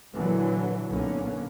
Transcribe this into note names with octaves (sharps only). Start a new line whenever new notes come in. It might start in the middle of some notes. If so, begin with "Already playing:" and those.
A#2 D3 E3 F#3
B1 F#2 A#2 D3 A#3 C#4